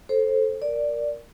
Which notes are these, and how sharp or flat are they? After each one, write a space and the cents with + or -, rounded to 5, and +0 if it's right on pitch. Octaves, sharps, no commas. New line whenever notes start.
A4 +0 C5 +15
A#4 +0 D5 +0